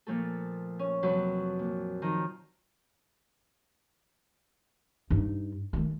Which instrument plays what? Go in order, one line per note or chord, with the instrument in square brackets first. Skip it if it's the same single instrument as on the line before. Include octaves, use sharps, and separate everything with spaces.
[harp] A#2 F3 A3 A4
C#4
F2 C3 F#3 B4
A#2
D#3 F3 A#5
[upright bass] G2 D#4
D#3 A3